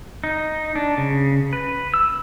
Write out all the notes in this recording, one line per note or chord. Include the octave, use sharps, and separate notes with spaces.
D#4
D4
C#3
B4
E6